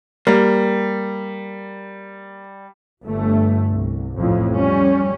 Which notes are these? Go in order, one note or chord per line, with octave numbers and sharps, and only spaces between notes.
G3 A#3
G1 G2 A3
C2
A1 F2 A2
G3 C#4